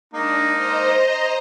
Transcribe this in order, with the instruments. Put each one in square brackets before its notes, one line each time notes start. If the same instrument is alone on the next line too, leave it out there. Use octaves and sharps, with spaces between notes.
[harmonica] G#3 A#3 D#4 [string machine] D4
[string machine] C5 D#5 A#5